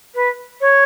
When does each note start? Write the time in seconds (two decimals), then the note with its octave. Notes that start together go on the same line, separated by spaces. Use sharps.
0.14 B4
0.60 C#5